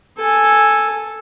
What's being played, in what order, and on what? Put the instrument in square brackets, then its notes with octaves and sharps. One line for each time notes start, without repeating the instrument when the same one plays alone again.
[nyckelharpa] A4 G#5